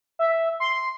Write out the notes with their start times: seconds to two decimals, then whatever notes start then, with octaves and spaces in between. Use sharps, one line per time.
0.19 E5
0.60 C6